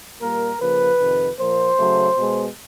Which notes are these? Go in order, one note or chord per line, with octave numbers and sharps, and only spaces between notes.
A#2 G3 A#3 A#4
C#3 F3 A#3 B4
F2 C3 D#3
A#2 F3 A#3 C5
C#3 F#3 A3
B2 G#3 B3